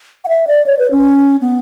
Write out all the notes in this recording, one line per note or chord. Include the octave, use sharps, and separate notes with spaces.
F#5
E5
D5
C#5
B4
C#4
B3